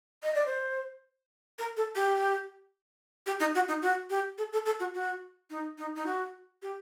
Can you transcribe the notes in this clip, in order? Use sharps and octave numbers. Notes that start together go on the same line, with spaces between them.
D#5
D5
C5
A#4
A4
G4
G4
D#4
F#4
D#4
F#4
G4
A4
A4
A4
F#4
F#4
D#4
D#4
D#4
F#4
G4